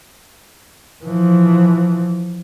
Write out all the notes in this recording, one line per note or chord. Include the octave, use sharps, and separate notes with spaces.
E3 F3